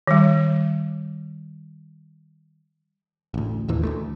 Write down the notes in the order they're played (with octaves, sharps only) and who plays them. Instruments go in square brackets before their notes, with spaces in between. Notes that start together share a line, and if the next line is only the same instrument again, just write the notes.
[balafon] D#3 G3
[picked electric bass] A1 D2
A1 D#2 A#2 E3
D2 G#3 A3